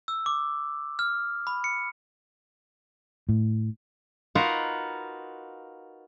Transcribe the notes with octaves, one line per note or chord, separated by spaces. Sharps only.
E6
D6
F6
B5
C#7
A2
D#4 F4 F#4 A#4 B4